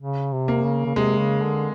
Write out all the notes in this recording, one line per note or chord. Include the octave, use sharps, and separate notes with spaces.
C#3
C3
A#3
C#3
C#3
C3 G#3
C#3
D3